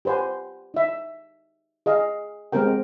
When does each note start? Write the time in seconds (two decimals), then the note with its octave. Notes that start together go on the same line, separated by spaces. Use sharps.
0.05 G4 B4 C5 F#5 G#5
0.74 D#4 E5
1.86 G#4 D#5 F5
2.52 G#3 B3 C4 G4 A#4 G5